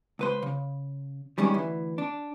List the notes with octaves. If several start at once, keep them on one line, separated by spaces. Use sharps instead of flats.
C#2 B4 C5
C#3
D#3 G3 G#3 C#4
D2 E3
D4